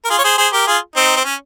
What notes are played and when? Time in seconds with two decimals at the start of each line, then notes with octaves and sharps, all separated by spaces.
0.05 A#4
0.10 F4 G#4
0.19 C#5
0.24 G#4 C5
0.38 G#4 C5
0.53 G4 A#4
0.67 F4 G#4
0.96 C4 D#4
1.16 C4
1.25 C#4